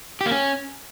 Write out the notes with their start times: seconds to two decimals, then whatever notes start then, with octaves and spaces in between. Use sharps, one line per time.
0.21 G4
0.26 A#3
0.31 C#4